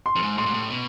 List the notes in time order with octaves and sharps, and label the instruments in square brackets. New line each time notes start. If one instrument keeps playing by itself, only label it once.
[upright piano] C6
[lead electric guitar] F2
G#2
[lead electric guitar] A2 [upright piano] C6
[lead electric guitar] G#2
A2
B2